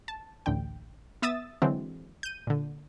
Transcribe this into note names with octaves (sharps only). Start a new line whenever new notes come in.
A5
A1 D2 D3 G5
B3 E5 D#6 E6 A6 E7
D3 E3 F#3 G#3 C4
G6 D#7
A#2 D3